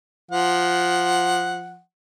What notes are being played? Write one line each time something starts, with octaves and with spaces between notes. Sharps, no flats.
F3 F#5